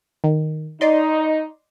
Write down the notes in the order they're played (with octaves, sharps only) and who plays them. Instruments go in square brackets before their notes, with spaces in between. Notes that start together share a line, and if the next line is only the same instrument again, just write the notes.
[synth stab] D#3
[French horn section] D#4 [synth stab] D5 D#5 C6